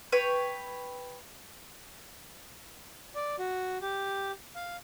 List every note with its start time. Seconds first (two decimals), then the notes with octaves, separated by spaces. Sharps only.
0.12 B4 C#5 G5
3.15 D5
3.39 F#4
3.82 G4
4.55 F5